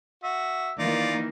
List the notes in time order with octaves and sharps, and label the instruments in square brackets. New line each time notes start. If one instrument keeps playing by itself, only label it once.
[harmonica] F#4 [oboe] E5
[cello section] D#3 E3 A#3 [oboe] D#4 [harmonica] F4 D5